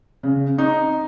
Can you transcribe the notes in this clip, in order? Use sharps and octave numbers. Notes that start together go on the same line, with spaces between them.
C#3
D#4